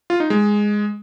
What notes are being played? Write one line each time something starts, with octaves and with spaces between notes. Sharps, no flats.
F4
D#4
G#3